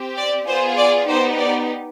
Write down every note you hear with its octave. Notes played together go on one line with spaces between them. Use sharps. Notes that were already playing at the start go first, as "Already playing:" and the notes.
Already playing: C4 G4
D5
B3 F4 G#4 C5
D5
B3 D#4 G4 C5
D5